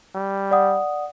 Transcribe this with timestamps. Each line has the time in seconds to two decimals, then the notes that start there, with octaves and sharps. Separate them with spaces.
0.15 G3
0.51 D5 F#5 D#6